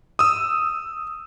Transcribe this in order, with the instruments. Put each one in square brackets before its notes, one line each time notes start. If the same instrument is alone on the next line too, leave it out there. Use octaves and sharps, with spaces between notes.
[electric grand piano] D#6 E6